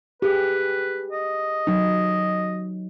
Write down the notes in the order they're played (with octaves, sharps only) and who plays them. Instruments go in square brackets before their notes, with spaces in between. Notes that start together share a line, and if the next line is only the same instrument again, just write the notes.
[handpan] G4 G#4 [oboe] B4
[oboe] D#5
[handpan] F#3 D#4